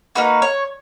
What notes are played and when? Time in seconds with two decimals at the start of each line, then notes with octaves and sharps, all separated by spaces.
0.15 A#3 D#4 F#4 B4
0.42 C#5